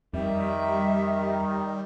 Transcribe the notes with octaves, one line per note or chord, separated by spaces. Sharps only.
F2 D#3 G3 E5